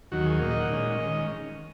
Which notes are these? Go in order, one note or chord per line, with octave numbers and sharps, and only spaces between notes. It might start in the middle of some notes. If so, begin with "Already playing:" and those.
D#2 D#3 F#3 F#4
G#4
A#2 A#3 D#4
D#5
F#5
A#2 G#3 C#4 D#5
D#3 G#3 C#4